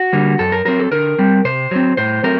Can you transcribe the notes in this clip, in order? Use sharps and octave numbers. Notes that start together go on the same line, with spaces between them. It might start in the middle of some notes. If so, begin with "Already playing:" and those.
Already playing: F#4
D3 G3 A#3
F#2 A4
A#4
F#3 C4 A#4
A4
D3 A#4
G3 C4
C3 C5
F#3 C4
A2 C5
F#3 A3 C4 A#4